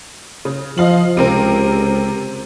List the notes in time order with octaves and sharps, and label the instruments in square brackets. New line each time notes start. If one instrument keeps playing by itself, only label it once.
[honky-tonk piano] C#3
[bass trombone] F3 [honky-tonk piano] D#5 F5 F#7
[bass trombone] C#2 [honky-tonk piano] C3 C4 A#4